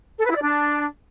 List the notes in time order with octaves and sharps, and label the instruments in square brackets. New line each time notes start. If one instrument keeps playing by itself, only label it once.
[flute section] A4
B4
E4
D5
D4